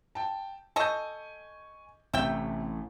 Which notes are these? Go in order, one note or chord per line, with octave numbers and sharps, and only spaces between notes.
G5 A5
A4 D#5 G#5 C#6 G6
A1 A2 C3 E5 G5